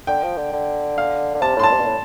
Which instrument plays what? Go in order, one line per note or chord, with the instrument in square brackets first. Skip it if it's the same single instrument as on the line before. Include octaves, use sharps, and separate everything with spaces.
[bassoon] D3 [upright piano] G5
[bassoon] F3
D3
D3
[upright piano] F5
[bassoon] D3
[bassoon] C3 [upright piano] A5
[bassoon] A2 [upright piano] C6
[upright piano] A5
[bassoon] C3
G2
A2